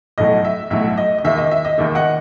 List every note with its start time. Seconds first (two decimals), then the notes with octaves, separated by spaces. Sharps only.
0.18 B1 A2 F#3 A3 D#5
0.45 E5
0.70 B1 A2 F#3 A3 E5
0.97 D#5
1.18 D#5
1.24 E1 D#2 D#3 E5
1.37 D#5
1.51 E5
1.65 D#5
1.78 E1 D#2 D#3 E5
1.95 D#5 F#5